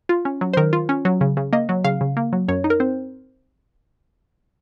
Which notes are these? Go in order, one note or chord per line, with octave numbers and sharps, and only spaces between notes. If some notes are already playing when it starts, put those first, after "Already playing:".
F4
C#4
F#3
C5
D#3 A#4
F4
C#4
F#3
C#3
C#3
A#3 D#5
F#3
C#3 F5
C#3
A#3
F#3
F#2 C#5
D#4
A#4
C4 C5